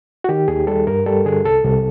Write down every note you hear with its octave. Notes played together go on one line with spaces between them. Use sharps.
F#4
D#3 G4
D#2 G#4
G3 A4
G2 A#4
G3 A4
D3 G#4
C2 A4
C2